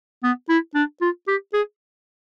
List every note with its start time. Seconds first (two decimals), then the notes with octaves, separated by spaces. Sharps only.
0.24 B3
0.50 E4
0.75 D4
1.01 F4
1.28 G4
1.53 G#4